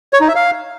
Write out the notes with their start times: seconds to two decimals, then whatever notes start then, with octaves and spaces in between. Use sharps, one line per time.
0.13 C#5
0.21 D#4
0.28 E5
0.35 F5